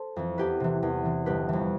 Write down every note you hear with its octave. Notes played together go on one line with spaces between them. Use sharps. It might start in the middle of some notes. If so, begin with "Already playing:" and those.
Already playing: A4 C5
F2 E3
E2 G4 B4
C3 E3
E2
C3 E3
G1 G4 B4
F2 E3